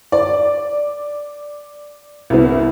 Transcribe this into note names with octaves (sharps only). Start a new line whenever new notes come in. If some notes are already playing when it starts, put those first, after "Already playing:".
D5
C2 B3